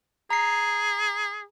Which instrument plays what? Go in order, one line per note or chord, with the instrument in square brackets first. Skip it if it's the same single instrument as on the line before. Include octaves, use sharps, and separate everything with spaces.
[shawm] G#4 [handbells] A#5 C7